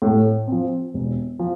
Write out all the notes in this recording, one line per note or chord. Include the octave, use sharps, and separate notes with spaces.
A2
F3 C4
E1
F3